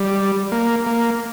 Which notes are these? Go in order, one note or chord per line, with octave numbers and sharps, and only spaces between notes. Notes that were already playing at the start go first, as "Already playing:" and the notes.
Already playing: G3
A#3
A#3